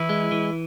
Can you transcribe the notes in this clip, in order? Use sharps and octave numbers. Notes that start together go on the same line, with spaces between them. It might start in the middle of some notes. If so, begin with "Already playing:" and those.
Already playing: E3 E4
G#3
E3